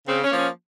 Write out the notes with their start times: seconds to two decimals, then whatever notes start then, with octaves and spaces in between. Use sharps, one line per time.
0.08 C#3 C4
0.24 C#4
0.31 F3 A#3
0.39 C#4